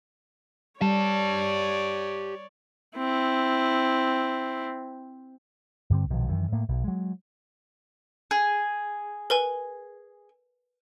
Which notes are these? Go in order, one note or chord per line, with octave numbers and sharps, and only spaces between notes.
G3 G4 C#5 D5 A5
C4 E4
G2 D3 G3 C4
B1 A#2 D#3 F3
F#2 D#3 E3
A2 A#3
B1
F#3 G#3
G#4
A#4 B4 G#5